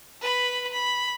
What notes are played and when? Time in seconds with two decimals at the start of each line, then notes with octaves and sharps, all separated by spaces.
0.21 B4 B5
0.72 B5